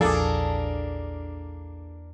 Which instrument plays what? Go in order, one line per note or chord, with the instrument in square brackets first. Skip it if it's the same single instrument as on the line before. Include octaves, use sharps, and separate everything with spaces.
[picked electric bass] A#1 F3 [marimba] E2 D6 [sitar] A#3 D4 [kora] G#4 A4